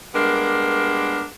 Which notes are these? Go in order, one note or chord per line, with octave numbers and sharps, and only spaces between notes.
G3 G#3 A#3 B3 D4 A#4